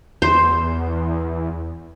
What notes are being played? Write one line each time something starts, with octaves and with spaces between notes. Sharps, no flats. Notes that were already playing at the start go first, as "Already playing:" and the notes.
E2 C5